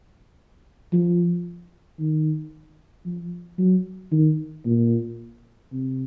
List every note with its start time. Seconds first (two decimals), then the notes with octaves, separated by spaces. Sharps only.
0.93 F3
2.00 D#3
3.06 F3
3.59 F#3
4.12 D#3
4.66 A#2
5.72 C3